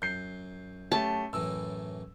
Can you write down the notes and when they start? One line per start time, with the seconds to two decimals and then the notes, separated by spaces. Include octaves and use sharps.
0.02 F#2 G6 C7
0.92 A3 C#4 G4 A5
1.33 F#2 A2 E3 E6